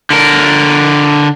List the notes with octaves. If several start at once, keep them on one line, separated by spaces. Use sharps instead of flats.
D3 A#4